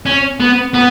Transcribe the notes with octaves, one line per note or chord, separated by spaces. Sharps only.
C#4
B3
B3